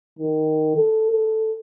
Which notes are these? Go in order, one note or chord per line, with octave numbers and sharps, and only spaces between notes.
D#3
A4
A4